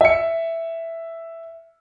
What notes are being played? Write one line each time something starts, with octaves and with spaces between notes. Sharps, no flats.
E5 C#7